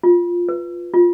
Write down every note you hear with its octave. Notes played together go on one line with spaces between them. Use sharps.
F4
B4
F4